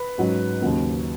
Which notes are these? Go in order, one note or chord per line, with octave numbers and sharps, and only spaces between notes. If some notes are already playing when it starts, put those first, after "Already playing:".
Already playing: B4
G#2 F#3 C#4
D#2 C#3 F#3 A#3